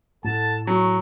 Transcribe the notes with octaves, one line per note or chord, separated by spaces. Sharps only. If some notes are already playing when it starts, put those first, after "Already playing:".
A2 A4 F#5 A5
F#3 C#6